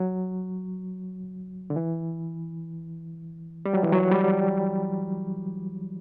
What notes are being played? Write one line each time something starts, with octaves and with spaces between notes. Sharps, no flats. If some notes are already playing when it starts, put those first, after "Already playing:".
Already playing: F#3
D3
E3
G3
F#3
E3
F#3
G3